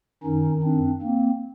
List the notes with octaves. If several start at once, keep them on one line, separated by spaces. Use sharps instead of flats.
F#2 D#3 C#4 D#4
C4 D4
A#3 C4